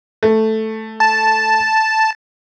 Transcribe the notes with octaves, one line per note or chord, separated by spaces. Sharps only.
A3
A5